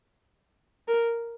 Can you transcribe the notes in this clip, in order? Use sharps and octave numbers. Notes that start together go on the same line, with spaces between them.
A#4